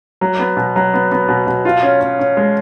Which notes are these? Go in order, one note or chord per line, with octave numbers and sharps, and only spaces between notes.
F#3
B3
B2
F#3
B3
B3
B2
B2
F4
C#4
C#4
C#4
G#3